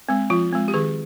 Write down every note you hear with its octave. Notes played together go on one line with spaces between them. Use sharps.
G#3 C4
F3 F4
G#3 C4
G4
D#3 G#4